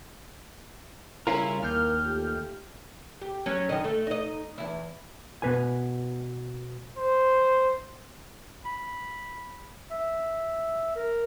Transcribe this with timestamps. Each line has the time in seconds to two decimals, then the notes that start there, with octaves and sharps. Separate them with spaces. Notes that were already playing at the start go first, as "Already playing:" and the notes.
1.27 C#3 G3 C#4 E4 F4 A#4
1.63 D#2 A#3 F6 G6
2.05 A3 F4 G4
3.21 G4
3.46 F#3 C#4
3.69 F#2 D#3 D#5
3.84 A3
4.07 D#4 D#5
4.58 E2 E4
5.42 B2 B4 G#5
6.98 C5
8.65 B5
9.91 E5
10.96 A#4